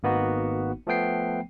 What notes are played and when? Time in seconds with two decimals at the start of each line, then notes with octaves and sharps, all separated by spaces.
0.03 G#1 A#3 B3 D#4 F#4
0.87 F3 A3 B3 G5 C7